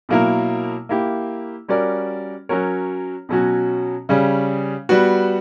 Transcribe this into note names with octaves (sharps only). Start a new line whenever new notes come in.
B2 F#3 A#3 E4 A#4
A#3 E4 G4
G3 C#4 F#4 A#4 D5
F#3 C#4 F#4 A#4 C#5
B2 F#3 C#4 F#4
C#3 G3 C#4
G3 B3 F#4